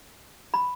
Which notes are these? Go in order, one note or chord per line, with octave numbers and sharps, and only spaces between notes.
B5